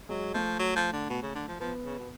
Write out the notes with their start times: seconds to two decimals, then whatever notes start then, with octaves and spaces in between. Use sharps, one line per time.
0.09 F#3 G#3
0.34 F3 A3
0.59 F#3
0.76 F3
0.93 D3
1.10 B2
1.22 C#3
1.35 D3
1.48 F3
1.60 F3 B3
1.85 C#3
1.98 B2